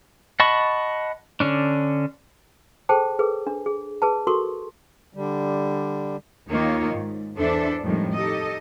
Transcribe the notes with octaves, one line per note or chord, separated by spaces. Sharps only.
D#5 F#5 A5 B5 C#6
D3 C#4 D4
G#4 A4 C5 G5 A5
G#4 A4 B4
D4
G#4
G#4 B4 A5
F#4 A4 A#4 C6 C#6
D3 G3
D#2 D#3 A#3 D#4 F4 C#5
G#2
E2 D4 A4 C5 D5 E5
F2 A2 D#3 G3 G#3
D#4 G4 A4 D#5